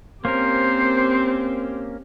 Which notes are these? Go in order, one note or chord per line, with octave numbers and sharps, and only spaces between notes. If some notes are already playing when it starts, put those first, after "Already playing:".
A#3 C4 C#4 G4 A#4 C5